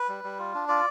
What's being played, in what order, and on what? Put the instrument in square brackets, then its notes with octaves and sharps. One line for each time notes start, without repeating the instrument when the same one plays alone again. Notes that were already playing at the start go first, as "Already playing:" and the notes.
Already playing: [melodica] B4
G3
G3
F4
D4
F4 D5